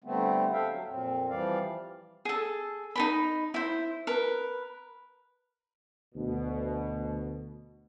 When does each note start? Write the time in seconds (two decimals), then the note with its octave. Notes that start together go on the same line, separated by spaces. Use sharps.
0.04 D3 G3 A3 B3 C4
0.52 A4 E5 F5 G5
0.69 F#3
0.88 F2 A#2 C4
1.30 E3 F3 G3 D5 F5
2.25 G#4 A4
2.96 D#4 A#4 B5
3.54 E4 C5
4.07 A#4 B4
6.15 D2 B2